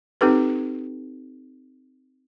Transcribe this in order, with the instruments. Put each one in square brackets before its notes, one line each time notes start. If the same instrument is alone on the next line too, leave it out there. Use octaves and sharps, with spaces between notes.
[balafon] C4 D#4 G4 A4 B4